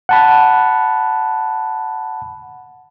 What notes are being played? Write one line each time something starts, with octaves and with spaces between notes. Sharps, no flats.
F#5 A5 B5